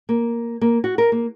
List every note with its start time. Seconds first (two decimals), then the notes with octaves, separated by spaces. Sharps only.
0.09 A#3
0.61 A#3
0.84 F#4
0.98 A#4
1.12 A#3